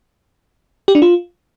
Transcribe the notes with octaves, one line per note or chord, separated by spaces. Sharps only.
G4
D4
F4